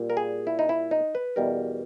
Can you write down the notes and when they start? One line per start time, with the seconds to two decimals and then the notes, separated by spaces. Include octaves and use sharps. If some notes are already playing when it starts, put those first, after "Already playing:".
Already playing: A#2 G3
0.10 A#4
0.17 G#4
0.47 E4
0.59 D#4
0.69 E4
0.91 D#4
1.15 B4
1.36 E2 B2 G3 A#4